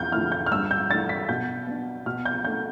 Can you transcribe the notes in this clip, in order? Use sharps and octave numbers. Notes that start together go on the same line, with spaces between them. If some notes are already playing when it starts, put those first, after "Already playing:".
Already playing: E2 G6
D3 F3 A3 E4 F6
G6
F6
G2 E6
G6
E3 A3 D4 A6
B6
B2 G6
B3 D4
B2 F6
G6
A3 D4 G6